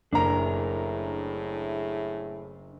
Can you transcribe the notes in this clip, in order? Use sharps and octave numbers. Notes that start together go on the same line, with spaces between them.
F#1 A2 D4 E4 G#4 A#4 A#5